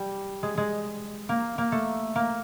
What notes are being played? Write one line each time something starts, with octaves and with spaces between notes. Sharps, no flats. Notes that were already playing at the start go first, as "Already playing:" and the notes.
Already playing: G3
G#3
G#3
A#3
A#3
A3
A#3